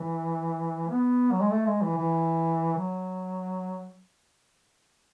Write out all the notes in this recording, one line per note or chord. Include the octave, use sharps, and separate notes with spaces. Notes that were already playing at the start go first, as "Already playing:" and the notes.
Already playing: E3
B3
F#3
G#3
A3
G#3
E3
E3
F#3